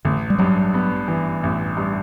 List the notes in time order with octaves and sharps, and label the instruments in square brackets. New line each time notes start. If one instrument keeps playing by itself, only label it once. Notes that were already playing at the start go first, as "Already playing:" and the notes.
[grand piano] A1 [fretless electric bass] D3
[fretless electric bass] G3
[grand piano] G2 [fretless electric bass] F#3
[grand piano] B3
E3
A1
G2